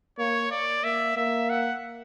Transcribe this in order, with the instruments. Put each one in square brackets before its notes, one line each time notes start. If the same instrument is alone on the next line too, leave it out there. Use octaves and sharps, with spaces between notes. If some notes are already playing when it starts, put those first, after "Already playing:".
[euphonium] A#3 [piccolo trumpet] C#5
[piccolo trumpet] D5
[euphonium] A#3 [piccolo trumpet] E5
[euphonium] A#3 [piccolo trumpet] E5
[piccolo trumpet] F#5